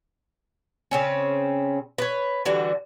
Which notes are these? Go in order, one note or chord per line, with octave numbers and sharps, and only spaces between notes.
C#3 C4 C#4
B4 C#5
D3 E3 G3 F#4